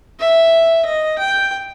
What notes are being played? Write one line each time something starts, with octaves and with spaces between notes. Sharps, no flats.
E5
D#5
G5